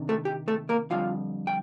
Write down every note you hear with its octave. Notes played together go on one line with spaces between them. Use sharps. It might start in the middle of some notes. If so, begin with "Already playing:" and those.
Already playing: C3 D#3 D4
A3 A4
G4
A3 A4
A#3 A#4
F2 D3 G3 F4 F5
G5